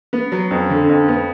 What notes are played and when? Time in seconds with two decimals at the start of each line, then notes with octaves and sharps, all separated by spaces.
0.13 B3
0.32 F#3
0.51 F2
0.70 D3
0.89 F2
1.08 B3